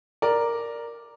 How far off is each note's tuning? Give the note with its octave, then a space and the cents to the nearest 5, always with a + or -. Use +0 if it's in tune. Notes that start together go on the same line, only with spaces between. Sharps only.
A#4 +0 D5 +0